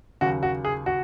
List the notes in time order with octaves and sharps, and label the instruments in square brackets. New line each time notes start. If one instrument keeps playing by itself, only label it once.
[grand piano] D#2 C#3 F#3 F#4
F#4
G#4
F#4